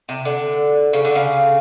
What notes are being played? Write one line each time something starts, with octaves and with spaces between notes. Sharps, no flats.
C3
D3
C#3
D3
C#3